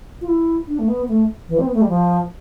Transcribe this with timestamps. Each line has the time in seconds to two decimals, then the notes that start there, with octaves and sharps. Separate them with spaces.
0.21 F4
0.28 E4
0.68 D4
0.79 A3
0.88 B3
1.08 A3
1.49 E3
1.59 C4
1.67 B3
1.74 A3
1.82 G3
1.89 F3